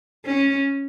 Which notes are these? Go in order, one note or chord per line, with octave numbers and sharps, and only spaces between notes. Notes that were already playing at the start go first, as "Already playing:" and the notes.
C#4